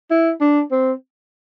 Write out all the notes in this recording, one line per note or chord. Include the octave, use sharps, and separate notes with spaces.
E4
D4
C4